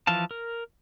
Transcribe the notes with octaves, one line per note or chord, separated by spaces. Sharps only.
E3 F3 F5 A5
A#4